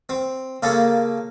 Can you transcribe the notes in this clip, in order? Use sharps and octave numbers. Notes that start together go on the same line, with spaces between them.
C4
C#3 A#3 A4